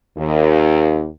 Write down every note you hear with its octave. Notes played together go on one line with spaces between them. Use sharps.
D#2